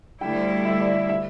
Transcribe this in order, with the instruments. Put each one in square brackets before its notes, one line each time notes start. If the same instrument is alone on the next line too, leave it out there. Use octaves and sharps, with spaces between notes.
[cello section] D2 D3 G3 E4 [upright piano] G5
[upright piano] E5
D5
E5
E5